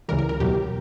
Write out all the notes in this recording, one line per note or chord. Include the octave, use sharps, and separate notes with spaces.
C#2 C#3 E3 G3 A#4
A#4
A#4
E2 B2 F#3 G4